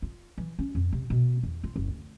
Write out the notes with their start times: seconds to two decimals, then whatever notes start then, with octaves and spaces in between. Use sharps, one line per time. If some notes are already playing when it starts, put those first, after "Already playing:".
0.02 F4
0.38 E3
0.59 C#4
0.75 F2
0.93 C3
1.10 B2
1.43 E2
1.64 F4
1.76 F#1
1.88 D2